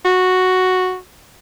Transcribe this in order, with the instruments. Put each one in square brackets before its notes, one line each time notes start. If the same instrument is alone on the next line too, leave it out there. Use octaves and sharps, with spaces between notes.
[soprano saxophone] F#4